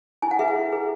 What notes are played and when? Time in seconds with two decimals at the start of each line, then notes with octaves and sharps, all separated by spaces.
0.22 E4 G#5
0.31 F#5
0.39 G#4 B4 E5
0.48 F#5
0.56 E4
0.72 G#4 B4